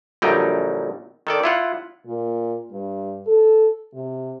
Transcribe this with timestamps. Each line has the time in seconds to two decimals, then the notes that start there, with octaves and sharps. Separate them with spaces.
0.22 A#1 D3 F#3 G3 D#4 G5
1.27 D#3 A4 D5
1.44 E4 F4 F#5
2.06 A#2
2.72 G2
3.27 A4
3.93 C3